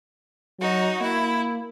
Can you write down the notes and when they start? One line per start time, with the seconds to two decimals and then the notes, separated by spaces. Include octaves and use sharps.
0.59 F#3 D#4 F#4
1.00 A#3 E4